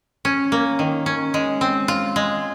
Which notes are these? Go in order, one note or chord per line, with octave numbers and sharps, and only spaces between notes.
C#4
A#3
D#3
C#4
G#3
C4
F4
G#3